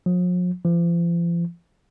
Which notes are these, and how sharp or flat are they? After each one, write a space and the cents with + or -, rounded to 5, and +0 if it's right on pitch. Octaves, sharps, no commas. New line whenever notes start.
F3 +45
F3 -40